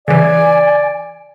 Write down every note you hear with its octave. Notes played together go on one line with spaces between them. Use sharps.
C#3 E3 D5 G#5